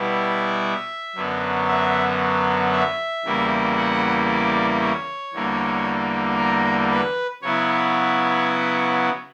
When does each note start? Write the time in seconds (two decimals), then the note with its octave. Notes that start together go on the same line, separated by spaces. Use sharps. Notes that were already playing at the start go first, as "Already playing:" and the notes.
Already playing: B2 G3 B3 E4
0.10 E5
1.15 F#2 D3 F#3 B3
1.68 E5
2.72 E5
3.25 E2 C#3 G3 A#3 E4
3.76 F#5
4.29 D5
4.81 C#5
5.33 E2 D3 G3 A#3
6.38 A#4
6.90 B4
7.42 C#3 F#3 B3 E4 C#5